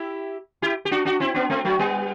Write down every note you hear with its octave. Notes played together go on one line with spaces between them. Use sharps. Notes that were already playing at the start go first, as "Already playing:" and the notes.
Already playing: E4 G4
E4 G4
G4
D4 F#4
D4 F#4
C4 E4
B3 D4
A3 C4
F#3 A3
G3 B3